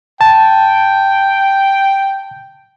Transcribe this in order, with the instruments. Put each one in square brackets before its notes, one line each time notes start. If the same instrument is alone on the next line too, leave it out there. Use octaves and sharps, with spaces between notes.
[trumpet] G5 [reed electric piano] A5